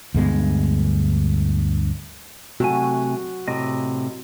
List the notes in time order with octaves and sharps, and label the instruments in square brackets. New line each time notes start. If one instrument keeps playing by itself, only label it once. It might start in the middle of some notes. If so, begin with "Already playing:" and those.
[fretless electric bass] D2 G2 G#3 B3
[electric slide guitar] C3 A3 G#5 [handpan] F#4
[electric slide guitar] A2 C3 D#5